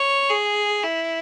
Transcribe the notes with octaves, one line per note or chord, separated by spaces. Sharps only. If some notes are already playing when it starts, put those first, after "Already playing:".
Already playing: C#5
G#4
E4